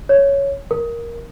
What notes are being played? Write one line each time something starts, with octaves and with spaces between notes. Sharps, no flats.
C#5
A#4